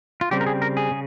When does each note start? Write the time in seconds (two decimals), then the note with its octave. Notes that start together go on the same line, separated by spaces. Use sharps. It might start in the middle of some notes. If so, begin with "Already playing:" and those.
0.21 F4
0.31 C#3 G3 C4 G4
0.41 A#4
0.47 G#4
0.62 A#4
0.77 G#4
0.91 C#3